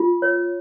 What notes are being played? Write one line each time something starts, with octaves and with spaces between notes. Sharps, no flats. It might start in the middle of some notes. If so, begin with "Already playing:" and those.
Already playing: F4
C#5